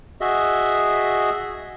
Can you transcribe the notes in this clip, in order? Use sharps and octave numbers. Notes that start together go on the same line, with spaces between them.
F#4 G#4 D#5 E5